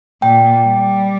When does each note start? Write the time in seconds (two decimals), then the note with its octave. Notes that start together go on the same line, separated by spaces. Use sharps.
0.22 A#2 G5
0.66 G3